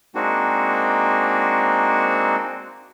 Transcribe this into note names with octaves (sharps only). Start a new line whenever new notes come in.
G#3 A#3 C4 D4 D#4 F#4